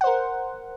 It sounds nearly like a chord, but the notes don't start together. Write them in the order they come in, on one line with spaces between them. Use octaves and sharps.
F#5 C5 A#4